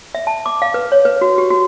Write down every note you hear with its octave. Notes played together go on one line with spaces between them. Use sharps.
E5
A5
D6
F5
B4
C#5
B4
F#4
G4
F#4